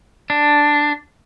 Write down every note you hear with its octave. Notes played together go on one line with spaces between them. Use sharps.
D4